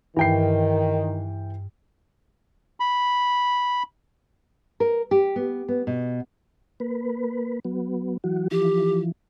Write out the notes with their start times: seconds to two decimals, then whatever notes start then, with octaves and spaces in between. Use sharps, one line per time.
0.17 G2 D#3 E3 G5 C7
2.80 B5
4.80 A#4
5.11 G4
5.36 B3
5.68 B3
5.87 B2
6.80 A#3 B4
7.65 F#3 B3
8.24 E3 F#3 F#4
8.51 E3 F3 G4